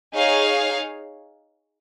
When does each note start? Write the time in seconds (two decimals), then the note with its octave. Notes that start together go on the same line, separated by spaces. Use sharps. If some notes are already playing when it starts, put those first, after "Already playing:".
0.14 D#4 G#4 C#5 F5